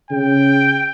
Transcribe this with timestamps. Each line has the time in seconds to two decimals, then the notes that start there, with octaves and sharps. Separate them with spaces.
0.11 C#3 G5